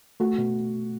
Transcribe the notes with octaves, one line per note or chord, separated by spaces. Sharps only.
A3 F#4
B2